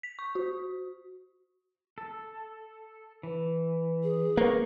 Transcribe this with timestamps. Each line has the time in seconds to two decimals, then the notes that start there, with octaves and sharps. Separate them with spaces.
0.03 B6
0.19 C#6
0.35 F#4
1.98 A4
3.23 E3
4.03 G#4
4.37 A#3 B4 C#6